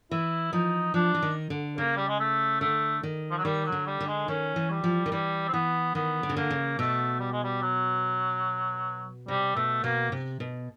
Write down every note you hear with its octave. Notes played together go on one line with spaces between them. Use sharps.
E3 E4
F3 D#4
F3 D4
E3
D#3
D3
C#3 A#3
G3
G#3
A3
D3 A3
D#3
F3
F#3
D#3 G3
F#3
D3
G3
D3
G#3
D#3 C#4
E3
G3
F3
D#3
E3 G3
C4
E3 B3
D#3 B3
D3
C#3
D3 A#3
C#3
B2 A3
G3
G#3
G3
F#3
C3 G3
B2 A3
B2 A#3
C3
B2